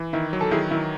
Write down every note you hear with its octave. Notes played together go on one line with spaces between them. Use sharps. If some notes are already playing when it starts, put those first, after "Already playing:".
Already playing: E3
D#3 E4
F#3
A4
D#3 E4 G#4
D#3 E4